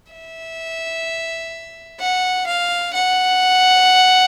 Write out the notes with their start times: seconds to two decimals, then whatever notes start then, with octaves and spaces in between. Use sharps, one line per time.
0.12 E5
2.00 F#5
2.48 F5
2.94 F#5